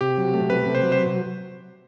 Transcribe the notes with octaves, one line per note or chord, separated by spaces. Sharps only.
C3 G4
F#3
A3
C3 B4
C3
C5
F#3
C5